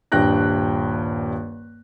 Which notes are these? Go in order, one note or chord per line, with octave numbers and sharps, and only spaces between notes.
D#1 G2 G5 F#6 A#6